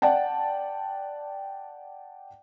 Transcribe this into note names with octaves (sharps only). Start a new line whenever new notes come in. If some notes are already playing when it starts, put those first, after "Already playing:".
D5 F#5 G5 A5